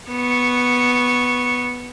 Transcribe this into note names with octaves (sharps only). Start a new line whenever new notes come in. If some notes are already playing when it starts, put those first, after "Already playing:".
B3 C#6